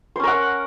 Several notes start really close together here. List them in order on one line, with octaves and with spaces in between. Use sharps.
C5 C#4 A#4 F#5